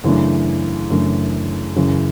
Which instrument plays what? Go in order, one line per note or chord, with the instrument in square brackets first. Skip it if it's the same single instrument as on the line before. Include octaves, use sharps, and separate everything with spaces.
[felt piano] F#2 C#3 E3 A3 D4
F#2 C#3 E3 A3 D4
F#2 C#3 E3